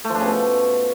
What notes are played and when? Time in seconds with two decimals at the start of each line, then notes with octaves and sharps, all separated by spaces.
0.05 A3
0.10 F3
0.15 D4
0.20 C#3
0.25 B2